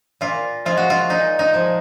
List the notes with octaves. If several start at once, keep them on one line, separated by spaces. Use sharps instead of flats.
A#2 F4
F3 G#3 F4
F#4
F4
A#2 D#4
D#4
F3 G#3